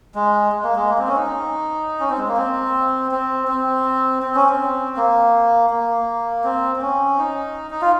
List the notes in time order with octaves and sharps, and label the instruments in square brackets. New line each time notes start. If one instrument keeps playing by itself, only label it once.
[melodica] G#3
G#3
A#3
G#3
A#3
C4
C#4
D#4
C#4
C4
G#3
A#3
C4
C4
C4
C4
C#4
C4
A#3
A#3
C4
C4
C#4
D#4
D#4
F4